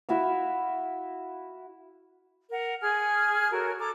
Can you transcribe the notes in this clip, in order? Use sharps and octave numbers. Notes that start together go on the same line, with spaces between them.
E4 F#4 E5 F5
A#4 F#5
G#4 G#5 F6
F#4 A4 A#4 C#5
A4 A#5 D6